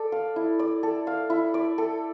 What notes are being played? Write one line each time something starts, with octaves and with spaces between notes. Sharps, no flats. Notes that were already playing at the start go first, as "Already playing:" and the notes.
Already playing: A4 D5
F5
E4
D5
A4
F5
E4
D5
A4